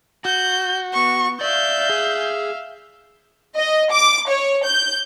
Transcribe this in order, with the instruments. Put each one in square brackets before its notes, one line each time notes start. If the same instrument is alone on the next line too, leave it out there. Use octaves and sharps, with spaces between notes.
[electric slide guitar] F#4 [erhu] G6
[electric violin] B3 [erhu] C#6
[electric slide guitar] D5 [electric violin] E5 F5 [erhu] G6
[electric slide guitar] G#4
[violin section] D#5
D6
C#5
G6